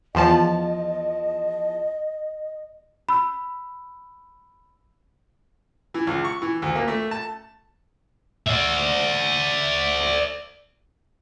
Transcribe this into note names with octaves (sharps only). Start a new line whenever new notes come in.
E2 F3 D#5 A5
B5 E6
E3
C#2
C#6
E3
D2
A#3
A3
A5
D5 E5